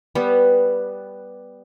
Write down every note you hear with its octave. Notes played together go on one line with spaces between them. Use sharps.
G3 B3